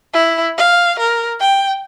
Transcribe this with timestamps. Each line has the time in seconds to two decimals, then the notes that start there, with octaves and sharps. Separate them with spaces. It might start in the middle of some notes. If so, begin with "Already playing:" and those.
0.13 E4
0.58 F5
0.99 A#4
1.40 G5